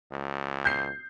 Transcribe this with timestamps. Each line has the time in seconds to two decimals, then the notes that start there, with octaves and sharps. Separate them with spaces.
0.11 C#2
0.65 G6 C7